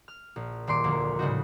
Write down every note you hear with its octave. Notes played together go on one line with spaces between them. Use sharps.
F6
A#1
D#1 A#2 C6 D6
F1 D2 A#3
A2 C#3 G3 D#4 F#4